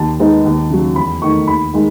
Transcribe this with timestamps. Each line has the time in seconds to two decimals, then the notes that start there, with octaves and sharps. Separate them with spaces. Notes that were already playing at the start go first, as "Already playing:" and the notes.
Already playing: D#2 A5
0.19 D#3 G#3 B3 D#4
0.45 D#2
0.70 C#3 F#3
0.96 E2 B5
1.21 D#3 A3 C#6
1.47 D#2 B5
1.74 D#3 G#3